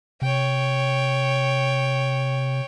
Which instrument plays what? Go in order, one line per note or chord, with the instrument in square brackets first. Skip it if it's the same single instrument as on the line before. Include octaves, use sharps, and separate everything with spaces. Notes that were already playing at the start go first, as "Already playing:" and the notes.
[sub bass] C3 [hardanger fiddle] C#5 G5